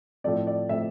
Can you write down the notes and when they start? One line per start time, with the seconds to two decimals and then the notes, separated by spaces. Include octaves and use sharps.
0.24 A2 F3 A3 C4 D5
0.47 D5
0.69 A2 F3 A3 C4 E5